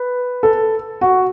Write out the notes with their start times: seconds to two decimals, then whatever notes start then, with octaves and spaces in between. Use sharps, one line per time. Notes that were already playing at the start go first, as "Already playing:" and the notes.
Already playing: B4
0.43 A4
1.01 F#4